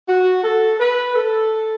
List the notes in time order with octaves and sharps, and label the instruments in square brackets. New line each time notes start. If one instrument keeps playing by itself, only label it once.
[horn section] F#4
A4
B4
A4